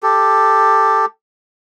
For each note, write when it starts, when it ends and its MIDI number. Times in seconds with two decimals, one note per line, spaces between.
0.03 1.06 67
0.03 1.06 69